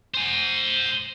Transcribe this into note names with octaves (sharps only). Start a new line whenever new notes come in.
C5 G#5